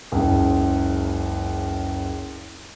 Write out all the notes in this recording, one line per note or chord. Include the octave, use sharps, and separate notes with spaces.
F#1 C#2